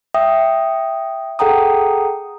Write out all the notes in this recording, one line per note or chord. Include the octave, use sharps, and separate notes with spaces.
E5 G5 D#6
G#4 A4 F#5 G5 A#5 D#6